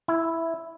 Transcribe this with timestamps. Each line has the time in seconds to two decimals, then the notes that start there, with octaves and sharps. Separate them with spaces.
0.08 E4